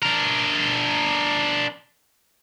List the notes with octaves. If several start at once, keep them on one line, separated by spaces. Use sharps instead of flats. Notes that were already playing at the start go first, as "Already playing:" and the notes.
D4 A#4